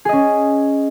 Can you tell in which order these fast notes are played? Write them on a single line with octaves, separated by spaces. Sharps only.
G#4 D#5 C#4